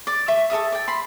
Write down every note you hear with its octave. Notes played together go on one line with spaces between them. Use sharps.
D5 D6
E5 C#6
A4 A#4 E5 D#6
D5 G5
B5 C6